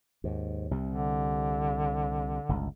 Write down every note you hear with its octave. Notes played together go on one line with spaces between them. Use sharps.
D#2 G#2
C2 C3
D3
G1 C#2